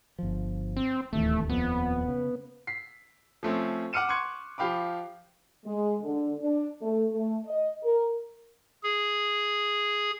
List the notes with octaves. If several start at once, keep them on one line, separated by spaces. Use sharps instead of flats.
G1 F3
C4
D1 D#2 E3 A3
D#1 F2 A#2 B3
C#3
B6 C7
F3 A3 C4 C#4
F#5 D6 F6 C#7 D#7 E7
C6 C#6 F#6 G#6 C#7
F3 G4 F5 B5 D6
G#3
D3
D4
A3
A3
D#5
A#4
G#4